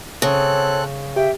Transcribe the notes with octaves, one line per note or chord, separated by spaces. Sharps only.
C#3 C4 A4 C#5 F#6
G4 E5 G5